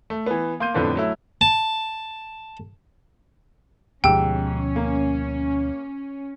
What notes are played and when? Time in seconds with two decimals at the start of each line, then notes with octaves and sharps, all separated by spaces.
0.10 A3
0.26 E3 B3
0.60 A#3 C6 G6 D#7
0.74 F2 A2 D3 B3 D4
0.95 F#3 A3 E4
1.41 A5
4.04 D2 G#2 B2 F3 C#4 G4 G5 E6
4.76 A#3